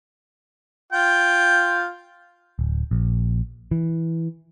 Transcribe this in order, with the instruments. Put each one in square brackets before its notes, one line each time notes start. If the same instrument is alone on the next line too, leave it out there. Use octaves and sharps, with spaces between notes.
[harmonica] F4 G5
[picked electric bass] D1
A#1
E3